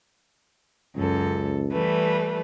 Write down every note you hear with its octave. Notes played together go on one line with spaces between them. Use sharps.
C#2 F#2 A4
E3 G3 A3 B4